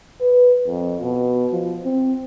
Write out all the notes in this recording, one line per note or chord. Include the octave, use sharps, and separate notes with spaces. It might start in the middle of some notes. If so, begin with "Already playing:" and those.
B4
F2
B2
F3
C4